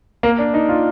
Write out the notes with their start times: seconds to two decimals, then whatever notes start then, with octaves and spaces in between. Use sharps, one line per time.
0.23 A#3
0.39 D4
0.54 D#4
0.69 F4